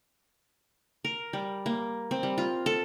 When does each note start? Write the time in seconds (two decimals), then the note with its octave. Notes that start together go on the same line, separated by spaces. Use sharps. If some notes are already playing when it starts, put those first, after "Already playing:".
1.05 A#4
1.33 G3
1.66 A#3
2.11 C4
2.23 G3
2.38 F4
2.66 A4